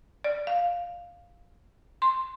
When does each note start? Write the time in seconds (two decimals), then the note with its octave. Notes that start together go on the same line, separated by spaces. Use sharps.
0.24 D5
0.47 F5
2.02 C6